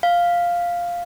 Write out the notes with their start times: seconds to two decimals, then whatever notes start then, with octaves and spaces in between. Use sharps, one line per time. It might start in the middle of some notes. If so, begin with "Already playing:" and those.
0.03 F5